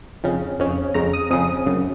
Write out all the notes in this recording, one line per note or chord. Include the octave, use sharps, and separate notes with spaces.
F2 C#3
F2 C#3
F2 C#3 A#5
D#6
F2 C#3 D#6
F#2 C#3